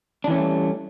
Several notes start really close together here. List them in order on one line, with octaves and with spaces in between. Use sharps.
D4 E3 C#4 A3 G3